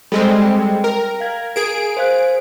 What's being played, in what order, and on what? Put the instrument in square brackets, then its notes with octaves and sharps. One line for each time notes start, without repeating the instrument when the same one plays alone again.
[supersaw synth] G3 G#3 C4 [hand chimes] A4
[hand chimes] G5
[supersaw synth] A#4
[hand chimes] F5 G#6
[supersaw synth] G#4 D7 [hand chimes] A#4
[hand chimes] C5 F5 F#6